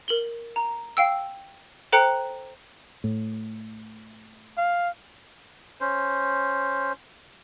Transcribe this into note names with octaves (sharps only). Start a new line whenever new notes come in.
A#4 F#7 G7
A#5
F5 G5 E6
A4 C5 G5 A#5 F#6 C#7
A2
F5
C#4 C5